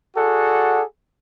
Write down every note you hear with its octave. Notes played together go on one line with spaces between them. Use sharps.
F#4 G#4 A4 D5 F#5